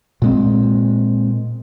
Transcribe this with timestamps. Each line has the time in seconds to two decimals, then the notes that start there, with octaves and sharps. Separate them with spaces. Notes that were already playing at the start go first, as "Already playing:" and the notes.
0.22 A#2 G#3 C4